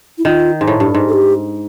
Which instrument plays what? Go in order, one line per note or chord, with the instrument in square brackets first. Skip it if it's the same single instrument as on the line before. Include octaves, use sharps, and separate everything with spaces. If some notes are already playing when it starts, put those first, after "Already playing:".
[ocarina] E4
[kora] D#3 [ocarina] F4
[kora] G#2
A2
G2
G#2
[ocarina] A4
G4